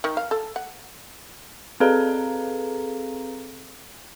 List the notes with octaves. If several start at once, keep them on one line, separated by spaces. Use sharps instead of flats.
D#3
F5
A4
F#5
C4 G#4 A4 B4 F5 A#5